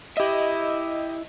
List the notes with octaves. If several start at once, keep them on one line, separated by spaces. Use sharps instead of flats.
E4 G4 D#5 E5